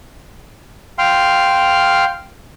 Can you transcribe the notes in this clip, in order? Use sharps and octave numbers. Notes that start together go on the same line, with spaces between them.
F5 G5 C6 F6